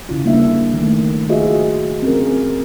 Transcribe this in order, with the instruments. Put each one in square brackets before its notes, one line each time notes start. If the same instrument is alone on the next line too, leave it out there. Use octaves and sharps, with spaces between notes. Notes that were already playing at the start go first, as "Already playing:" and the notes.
[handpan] C#3 E4 F4
G3 A#3 C#4 D4 E5
D#3 A3
F4 F#4 G#4 C5 D#5 E5
C4 C#4 F4 G#4 A#4